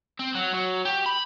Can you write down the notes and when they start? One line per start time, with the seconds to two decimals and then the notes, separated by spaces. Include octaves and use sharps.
0.20 C4
0.35 F#3
0.54 F#3
0.85 G4
1.06 B5